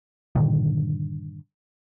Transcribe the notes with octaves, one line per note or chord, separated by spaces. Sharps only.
G2 A#2 D3 D#3